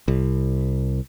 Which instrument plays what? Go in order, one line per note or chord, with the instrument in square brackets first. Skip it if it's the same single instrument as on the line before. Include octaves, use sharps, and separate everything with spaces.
[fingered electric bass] C2